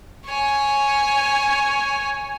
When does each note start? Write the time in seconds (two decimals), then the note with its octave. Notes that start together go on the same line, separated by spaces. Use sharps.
0.28 C#5 G#5